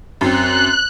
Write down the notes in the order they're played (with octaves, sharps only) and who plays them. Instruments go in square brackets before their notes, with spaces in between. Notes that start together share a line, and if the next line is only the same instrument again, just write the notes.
[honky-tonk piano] F#2 C4 [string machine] F#6